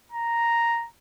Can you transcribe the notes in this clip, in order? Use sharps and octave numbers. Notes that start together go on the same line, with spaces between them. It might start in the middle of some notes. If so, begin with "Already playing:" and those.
A#5